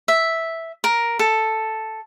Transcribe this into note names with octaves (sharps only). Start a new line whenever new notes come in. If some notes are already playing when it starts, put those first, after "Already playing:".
E5
A#4
A4